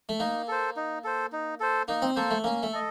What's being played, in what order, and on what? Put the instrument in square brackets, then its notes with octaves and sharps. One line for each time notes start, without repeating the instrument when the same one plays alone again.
[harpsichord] A3
[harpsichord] A#3 [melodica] D#4
[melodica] A4 C5
D#4
A4 C5
D#4
A4 C5
[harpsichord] A#3 [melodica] D#4
[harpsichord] C4
[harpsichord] A#3 [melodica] A4 C5
[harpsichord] A3
[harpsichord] A#3 [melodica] C#4
[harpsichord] A3
[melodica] A4 D#5